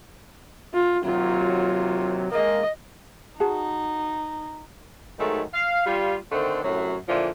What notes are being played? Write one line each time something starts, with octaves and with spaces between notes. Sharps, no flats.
F4
D#2 C3 F#3 F4
G#3 A#3 D#5
D#4 F#4 G#4 A5
G#2 D#3 F#3 A3
F5
G3 F4
D3 D#3 A3 C4
F#2 A2 C3 F#3
A#2 D3 E3 F3